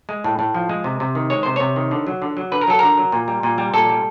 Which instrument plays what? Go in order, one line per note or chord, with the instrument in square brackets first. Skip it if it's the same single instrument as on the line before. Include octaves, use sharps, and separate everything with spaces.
[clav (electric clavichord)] G#3
A2
A2
F3
G#3
C3
C3
D#3
G#3 C#5
C3 C5
C3 C#5
D#3
D3
F#3
D3
F#3
D3 B4
A#4
F#3 A4
D3 A#4
F#3
A#2
G3
A#2
G3
A#2 A4
G3